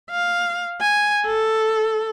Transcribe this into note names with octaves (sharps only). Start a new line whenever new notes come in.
F5
G#5
A4